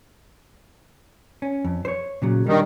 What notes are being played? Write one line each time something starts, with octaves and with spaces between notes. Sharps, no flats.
C#4
F2
C5 C#5
A#2 C#3 F#3
D#3 G3 D4